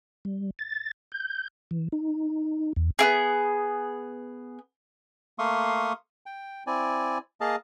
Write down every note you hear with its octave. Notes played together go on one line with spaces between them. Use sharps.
G3
A6
G6
E3
D#4
E2
B3 E4 G#4
A3 A#3 F5 C6 C#6 D#6
G5
C4 E4 D5 G#5
A#3 G#4 D#5 F5 A5